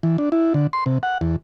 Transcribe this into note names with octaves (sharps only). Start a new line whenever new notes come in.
E3
D4
E4
D3
C6
C3
F#5
E2